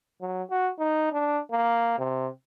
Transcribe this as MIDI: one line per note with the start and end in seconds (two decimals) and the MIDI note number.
0.21 0.43 54
0.50 0.70 66
0.79 1.08 63
1.12 1.40 62
1.52 1.95 58
1.99 2.28 48